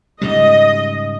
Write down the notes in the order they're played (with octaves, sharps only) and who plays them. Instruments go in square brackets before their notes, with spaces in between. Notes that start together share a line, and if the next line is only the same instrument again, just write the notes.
[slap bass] G#2 C#3 G3 [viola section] D#5